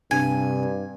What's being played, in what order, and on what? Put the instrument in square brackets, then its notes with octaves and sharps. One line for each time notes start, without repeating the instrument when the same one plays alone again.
[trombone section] G2 [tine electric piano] C3 C4 D4 [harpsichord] G#5 [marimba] G#6